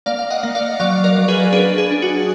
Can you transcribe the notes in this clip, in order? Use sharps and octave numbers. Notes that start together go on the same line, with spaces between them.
A#3 D5 F5
F5
D#5 F#5
A#3
D5 F5
F#3 D5 F5
A#4 D5
F#3
G#4 B4
D4 G#4 B4
G#4
D4
F#4